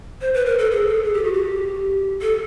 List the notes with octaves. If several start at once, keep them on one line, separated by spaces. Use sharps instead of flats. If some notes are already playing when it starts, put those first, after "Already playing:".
C5
B4
A#4
A4
G#4
A4
G#4
G4
F#4
G4
A4